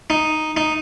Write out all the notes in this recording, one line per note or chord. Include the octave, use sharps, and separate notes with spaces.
D#4
D#4